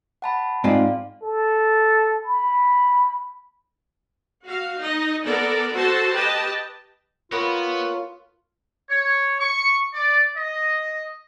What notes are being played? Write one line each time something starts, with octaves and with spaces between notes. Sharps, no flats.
F#5 A5 B5
G#2 C4 F4 D5 F5
A4
B5
F#4 F5
D#4 D#5
B3 A4 A#4 D5
F#4 A4 C5 A5
G4 B4 D#5 A5
B3 F4 A#4 B4 C#5
C#5
C#6
D5
D#5